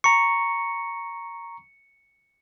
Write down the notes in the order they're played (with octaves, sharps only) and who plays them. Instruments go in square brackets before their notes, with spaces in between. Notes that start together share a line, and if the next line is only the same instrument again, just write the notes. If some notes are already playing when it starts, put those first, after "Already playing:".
[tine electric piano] A#5 C#6 [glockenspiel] C#7